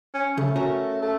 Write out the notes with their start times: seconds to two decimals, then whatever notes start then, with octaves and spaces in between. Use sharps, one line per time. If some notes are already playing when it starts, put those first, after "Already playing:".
0.14 C#4
0.37 C#3 A3
0.56 C#4 F#4 A#4
1.02 A3